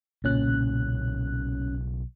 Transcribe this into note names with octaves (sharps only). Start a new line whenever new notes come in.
B1 A#2 C#3 C#4 F#6